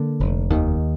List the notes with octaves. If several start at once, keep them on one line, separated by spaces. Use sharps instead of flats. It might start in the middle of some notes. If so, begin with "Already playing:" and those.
Already playing: D3 A#3
F1
D#2 D#3